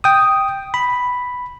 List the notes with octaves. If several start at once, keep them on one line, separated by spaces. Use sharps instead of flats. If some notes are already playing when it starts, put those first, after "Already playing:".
G5 D#6
B5